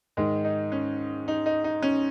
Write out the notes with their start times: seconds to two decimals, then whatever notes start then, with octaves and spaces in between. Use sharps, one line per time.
0.17 G#2 D#3 G#3
0.45 D#4
0.72 C#4
1.28 D#4
1.46 D#4
1.64 D#4
1.82 C#4